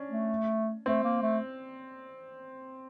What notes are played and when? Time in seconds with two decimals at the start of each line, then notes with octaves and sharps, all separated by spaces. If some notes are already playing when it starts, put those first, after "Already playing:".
Already playing: C#4 D4
0.11 A3
0.86 A3 C4
1.04 A#3
1.22 A3